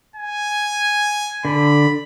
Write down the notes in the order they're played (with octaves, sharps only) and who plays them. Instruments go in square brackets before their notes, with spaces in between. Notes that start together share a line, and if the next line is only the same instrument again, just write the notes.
[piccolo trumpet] G#5
[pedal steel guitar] D3 [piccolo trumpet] B5